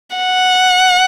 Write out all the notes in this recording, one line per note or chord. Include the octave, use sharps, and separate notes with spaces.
F#5